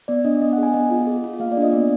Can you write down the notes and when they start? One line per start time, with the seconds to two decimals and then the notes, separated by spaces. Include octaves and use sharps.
0.08 B3 D5
0.25 D4 D#5
0.42 B3 D#5
0.53 F#5
0.58 G#4 G#5
0.74 B3 D#5
0.91 F4
1.07 G#4
1.24 F4
1.40 A#3 F5
1.52 D5
1.57 D4
1.62 D#5
1.73 B3 D5